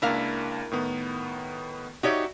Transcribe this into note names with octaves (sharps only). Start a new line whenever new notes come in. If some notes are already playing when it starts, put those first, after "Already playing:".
C#2 A#3 D4 E4 A#4 F5
A2 D#3 B3
D#4 F#4 G4 C#5 D5 E5